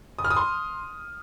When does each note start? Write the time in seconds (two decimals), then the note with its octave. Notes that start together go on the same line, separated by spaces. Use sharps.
0.19 D#6
0.25 F6
0.30 D#6
0.36 C6